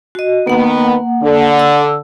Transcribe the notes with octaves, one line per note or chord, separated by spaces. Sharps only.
F#4 D#5
D#3 A#3 B3 F#5
D3
E6